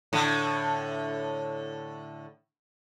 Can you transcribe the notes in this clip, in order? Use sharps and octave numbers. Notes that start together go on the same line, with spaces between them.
A2 D3